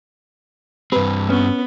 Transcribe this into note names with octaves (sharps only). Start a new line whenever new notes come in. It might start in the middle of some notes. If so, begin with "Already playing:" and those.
G2 C4 B4
B3 C#4